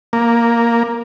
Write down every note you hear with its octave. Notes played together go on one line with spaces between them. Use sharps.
A#3